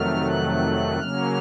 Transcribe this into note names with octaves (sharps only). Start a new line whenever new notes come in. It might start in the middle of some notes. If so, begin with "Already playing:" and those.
Already playing: F2 C3 D#3 F#3 A3 F6
F#6
C#3 F#3 A#3 C#4 F6